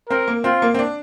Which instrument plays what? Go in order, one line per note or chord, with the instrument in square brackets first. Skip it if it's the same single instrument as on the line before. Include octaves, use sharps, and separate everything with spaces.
[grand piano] C4 [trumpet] A#4
[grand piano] A#3
[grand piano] C4 [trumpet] F4
[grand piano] A#3
C4
D4